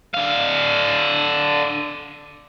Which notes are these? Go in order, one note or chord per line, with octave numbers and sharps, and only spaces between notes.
D3 F5